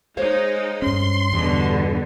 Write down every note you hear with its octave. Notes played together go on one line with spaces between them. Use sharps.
G#3 D#4 C5 C#5 F5
G2 C#4 C6
E2 G2 B2 D3